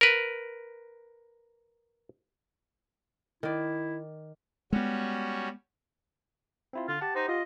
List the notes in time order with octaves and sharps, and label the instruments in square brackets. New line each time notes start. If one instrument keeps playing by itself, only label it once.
[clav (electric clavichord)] A#4 B4
[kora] D#3 D5 [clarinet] E4
[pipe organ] G3 C#4 F#4 [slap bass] G#3 B3
[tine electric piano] C4 E4 F4
[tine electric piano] D3 [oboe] F4
[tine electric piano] G4 F#5 [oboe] A5
[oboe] D#4 [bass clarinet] C5
[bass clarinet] F4 [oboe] D#5